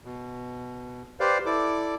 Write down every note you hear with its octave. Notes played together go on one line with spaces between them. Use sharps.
B2
G4 B4 C5 D5 F5
E4 A4 D5 D6